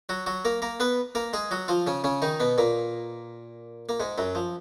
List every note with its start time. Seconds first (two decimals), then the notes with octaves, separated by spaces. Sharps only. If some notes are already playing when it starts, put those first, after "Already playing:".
0.09 F#3 F#4
0.26 F#3 F#4
0.45 A#3 A#4
0.62 A#3 A#4
0.80 B3 B4
1.15 A#3 A#4
1.33 G#3 G#4
1.51 F#3 F#4
1.68 F3 F4
1.87 C#3 C#4
2.04 C#3 C#4
2.22 D#3 D#4
2.40 B2 B3
2.58 A#2 A#3
3.89 A#3
4.00 G#2 G#3
4.18 F#2 F#3
4.35 F3